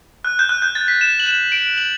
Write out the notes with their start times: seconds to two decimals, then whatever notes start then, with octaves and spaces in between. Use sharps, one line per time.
0.25 F#6
0.39 G6
0.49 F#6
0.62 G6
0.75 A6
0.88 B6
1.01 E7
1.20 F#7
1.26 E7
1.52 D7
1.78 F#7